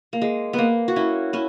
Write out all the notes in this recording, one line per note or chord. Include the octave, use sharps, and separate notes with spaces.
A#3
G#3
B3
A#3
F#4
C#4 E4
C#4 E4